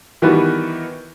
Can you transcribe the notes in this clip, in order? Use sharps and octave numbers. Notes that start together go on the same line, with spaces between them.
D#3 E3 G3 B3 F#4 B4